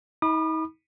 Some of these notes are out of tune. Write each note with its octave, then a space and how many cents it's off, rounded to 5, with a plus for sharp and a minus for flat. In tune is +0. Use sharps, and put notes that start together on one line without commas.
D#4 +40 B5 -15 D#6 -45